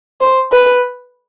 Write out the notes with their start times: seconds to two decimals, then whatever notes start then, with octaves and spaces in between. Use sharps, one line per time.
0.21 C5
0.52 B4